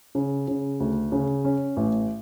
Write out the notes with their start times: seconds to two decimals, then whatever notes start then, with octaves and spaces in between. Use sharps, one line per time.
0.15 C#3
0.48 C#3
0.80 D2
1.12 C#3
1.45 C#4
1.77 A1